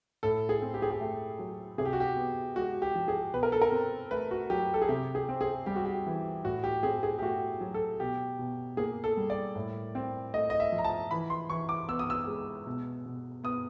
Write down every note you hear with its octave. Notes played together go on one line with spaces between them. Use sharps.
A2 A4
G#4
C4
G4
G#4
G4
A3
F#3
C3 G#4
G4
F#4
G4
B3
G#3 F#4
G4
F3
G#4
B2 B4
A#4
A4
A#4
C4
A3 B4
F#4
F#3 G4
A4
G#4
C3 G4
G#4
C4
G#4
G3 G4
F#4
G4
E3
A2 F#4
G4
C4 G#4
G#4
G4
A3 F#4
F#3
A4
B2 G4
B2
A#3 G#4
A4
G3
D5
A2
C4
A3 D#5
D#5
E5
F3
A#5
A5
E3 B5
C6
E3 C#6
D6
B3 E6
D#6
E6
G#3
B2
B2
B3 D#6